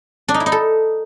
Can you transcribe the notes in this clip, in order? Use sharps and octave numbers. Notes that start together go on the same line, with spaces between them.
D4
D#4
E4
D#4
A4